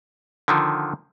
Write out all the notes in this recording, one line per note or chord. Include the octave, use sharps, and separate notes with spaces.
D3 D#3 F3